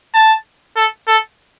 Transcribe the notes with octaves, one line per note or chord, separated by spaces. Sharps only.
A5
A4
A4